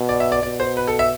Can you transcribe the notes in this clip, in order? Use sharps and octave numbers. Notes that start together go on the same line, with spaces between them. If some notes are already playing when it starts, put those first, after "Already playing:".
Already playing: B2
D5
E5
D5
B2 D5
C5
B4
A4
E5